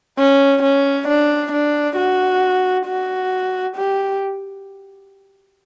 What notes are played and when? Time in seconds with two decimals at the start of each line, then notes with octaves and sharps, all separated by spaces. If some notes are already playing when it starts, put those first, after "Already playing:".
0.18 C#4
0.62 C#4
1.08 D4
1.52 D4
1.97 F#4
2.86 F#4
3.76 G4